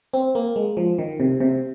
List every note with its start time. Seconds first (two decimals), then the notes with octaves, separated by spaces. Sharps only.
0.13 C4
0.35 A#3
0.56 G#3
0.77 F3
0.98 D#3
1.20 C3
1.40 C3